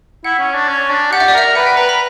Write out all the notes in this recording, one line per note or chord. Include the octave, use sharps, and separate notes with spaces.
E4 F#5
C#4
D4
C#4
D4
G4 F#5
E5
D5
A#4 E5
B4 F#5
G5
B4 A#5
B5